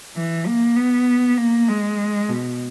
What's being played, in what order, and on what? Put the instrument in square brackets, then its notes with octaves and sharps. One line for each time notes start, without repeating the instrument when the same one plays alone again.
[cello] E3
A#3
B3
A#3
G#3
B2